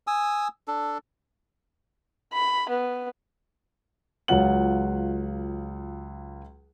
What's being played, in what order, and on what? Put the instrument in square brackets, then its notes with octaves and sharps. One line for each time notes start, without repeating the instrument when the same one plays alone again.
[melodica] G#5 D#6 E6
D4 A4
[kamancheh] B5
B3
[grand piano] C#2 F#3 F4 F#5 F#7